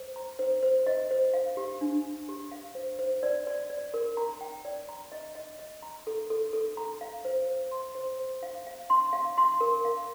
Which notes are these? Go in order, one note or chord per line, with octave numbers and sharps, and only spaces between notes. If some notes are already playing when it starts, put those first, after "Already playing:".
Already playing: C5
A#5
C5
C5
D#5
C5
F5
G4
D4
D4
G4
F5
C5
C5
D5
D5
D5
A#4
A#5
G5
D5
A#5
D#5
D#5
D#5
A#5
A4
A4
A4
A#5
F5
C5
C5
C6
C5
C5
F5
F5
C6
F5
C6
A#4
F5